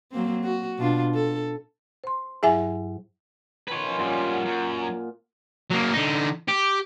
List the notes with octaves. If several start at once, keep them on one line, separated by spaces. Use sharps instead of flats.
F#3 A#3 C4
F#4
B2 D4 F4
A4
C5 C6
G2 F#3 E4 G#4 E5 G#5
D#3 F3 B4 C#5 G5
F3 C#4
F#2 A#2 G3 F#5 C6
F#2
A#3
F#3 A#3
D3 D#4
G4